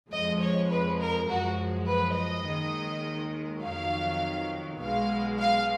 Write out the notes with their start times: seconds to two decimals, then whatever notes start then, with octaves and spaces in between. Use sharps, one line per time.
0.11 F2 F3 G#3 D#5
0.40 C#5
0.70 B4
0.99 A#4
1.29 F#2 F3 G#3 F#4
1.87 B4
2.16 D#5
2.47 D#2 D#3 G#3
3.63 F2 D#3 F#3 F5
4.81 B1 B2 G#3 F5
5.39 F5